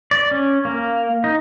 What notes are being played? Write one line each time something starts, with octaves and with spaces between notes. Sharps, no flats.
D5
C#4
A#3
D#4